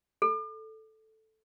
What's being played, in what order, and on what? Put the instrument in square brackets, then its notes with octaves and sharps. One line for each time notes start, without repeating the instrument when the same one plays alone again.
[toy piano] A4